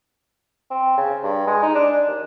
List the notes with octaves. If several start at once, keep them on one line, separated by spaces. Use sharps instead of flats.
C4
C#3
G2
G#3
D#4
D4
D#2